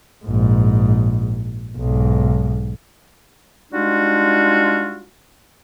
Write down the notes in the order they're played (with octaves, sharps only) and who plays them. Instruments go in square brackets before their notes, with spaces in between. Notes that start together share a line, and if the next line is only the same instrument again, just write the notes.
[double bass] A#1 G#2
B1 G#2
[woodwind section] G3 G#3 D4 D#4 F4 F#4